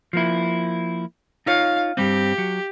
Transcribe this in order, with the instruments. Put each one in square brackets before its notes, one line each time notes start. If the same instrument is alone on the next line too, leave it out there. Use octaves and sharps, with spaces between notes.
[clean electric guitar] F3 A#3 E4
[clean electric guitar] D#4 F4 C#5 [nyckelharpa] F5
[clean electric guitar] G2 G3 C4 [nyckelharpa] G4
[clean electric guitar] F#3